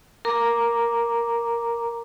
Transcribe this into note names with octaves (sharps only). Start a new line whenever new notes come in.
A#4 A#5 D6